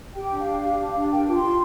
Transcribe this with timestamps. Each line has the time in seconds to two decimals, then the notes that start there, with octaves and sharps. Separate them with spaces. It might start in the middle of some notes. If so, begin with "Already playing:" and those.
0.14 G4 G5
0.31 D4
0.38 F5
0.46 D4
0.61 G4
0.78 G4
0.94 D4
1.10 A#4 G5
1.26 F4 D6
1.34 C6
1.42 F4